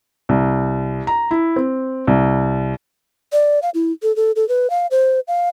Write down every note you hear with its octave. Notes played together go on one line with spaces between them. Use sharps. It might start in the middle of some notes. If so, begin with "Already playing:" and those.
C2
A#5
E4
C4
C2
D5
F5
E4
A4
A4
A4
B4
F5
C5
F5